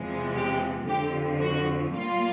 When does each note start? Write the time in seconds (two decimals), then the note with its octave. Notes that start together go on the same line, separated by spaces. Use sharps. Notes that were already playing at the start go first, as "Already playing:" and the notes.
Already playing: E2 C3 F3 G#3
0.35 G4
0.88 F2 D3 F3 G4
1.42 F#4
1.94 A#2 G3 A#3 F4